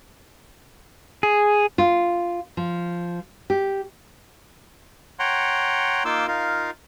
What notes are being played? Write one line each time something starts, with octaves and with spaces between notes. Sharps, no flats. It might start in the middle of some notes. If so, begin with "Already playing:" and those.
G#4
F4
F3
G4
C#5 F#5 G5 A#5 C6
A#3 D#4 F4 C6 D6 E6
D#4 F4 A#4 F5